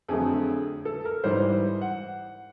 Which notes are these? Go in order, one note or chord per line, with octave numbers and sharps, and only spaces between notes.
F2 D3 F#3 A3 G#4
A4
A#4
G#2 E3 G3 C5
F#5